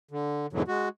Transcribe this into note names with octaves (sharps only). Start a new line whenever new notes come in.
D3
E2 G#2 B2 D3 E3 F#3
G#3 F#4